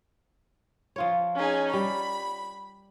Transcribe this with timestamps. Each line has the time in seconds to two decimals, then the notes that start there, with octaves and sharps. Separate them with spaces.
0.96 F3 F4 C#5
1.36 C#4 D#4 G#4
1.73 G3 B5